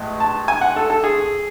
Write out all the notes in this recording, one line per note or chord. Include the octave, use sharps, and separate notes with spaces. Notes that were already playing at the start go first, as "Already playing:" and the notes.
Already playing: A1 A2 G#3
A5
G#5
F#5
A4
A4
G#4